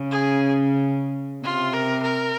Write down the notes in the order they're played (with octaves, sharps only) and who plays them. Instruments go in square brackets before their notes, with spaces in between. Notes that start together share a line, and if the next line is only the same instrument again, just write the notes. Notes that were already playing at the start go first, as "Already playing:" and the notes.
Already playing: [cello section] C#3
[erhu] G#4
[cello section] C3 [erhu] F4
[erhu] A#4
A#4